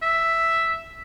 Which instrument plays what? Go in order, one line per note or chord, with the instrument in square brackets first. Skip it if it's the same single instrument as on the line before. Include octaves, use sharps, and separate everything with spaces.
[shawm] E5